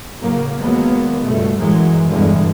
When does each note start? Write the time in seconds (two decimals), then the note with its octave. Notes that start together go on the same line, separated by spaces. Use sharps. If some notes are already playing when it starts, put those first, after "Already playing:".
0.19 A2 C#3 F#3 A#3
0.60 D#2 F#3 G#3 A#3 B3
1.21 C#2 G2 B2 A3
1.56 F#2 A2 E3 F#3 G#3
2.08 E2 G2 B2 D3 E3 G#3